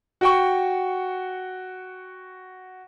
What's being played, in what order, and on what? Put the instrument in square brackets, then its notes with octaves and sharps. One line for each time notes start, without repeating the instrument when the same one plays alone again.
[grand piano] F#4 G5 C#6